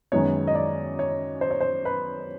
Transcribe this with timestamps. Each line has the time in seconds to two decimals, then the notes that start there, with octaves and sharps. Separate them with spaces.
0.12 F#2 D#3 G#3 B3 C#5
0.47 D#5
0.55 D5
0.99 C#5
1.41 C5
1.51 C#5
1.60 C5
1.85 B4